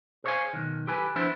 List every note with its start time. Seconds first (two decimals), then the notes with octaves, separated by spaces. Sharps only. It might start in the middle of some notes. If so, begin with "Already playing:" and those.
0.24 G#4 C5 C#5 D#5 F5 G#5
0.53 B1 D#3
0.87 G4 A4 B4 G#5
1.15 F3 B3 D4 E4 C5